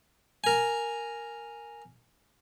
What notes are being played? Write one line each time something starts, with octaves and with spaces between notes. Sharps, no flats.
A#4 G#5